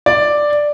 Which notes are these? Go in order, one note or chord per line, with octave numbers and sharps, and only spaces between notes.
D5